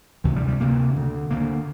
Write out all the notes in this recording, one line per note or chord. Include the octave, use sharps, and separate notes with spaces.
D2 C3 E3
G3
G3
D2 C3 A#3
D2 D3
D2 D3 A#3